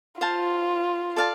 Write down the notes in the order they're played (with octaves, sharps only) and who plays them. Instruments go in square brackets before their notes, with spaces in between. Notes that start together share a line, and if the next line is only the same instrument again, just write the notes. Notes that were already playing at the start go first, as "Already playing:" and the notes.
[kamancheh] F4 [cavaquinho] C5 F5 A5
[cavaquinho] A4 D5 F5 A5